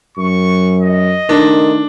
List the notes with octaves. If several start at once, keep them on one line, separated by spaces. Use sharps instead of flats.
F#2 C#6
D#5
D#3 A3 D4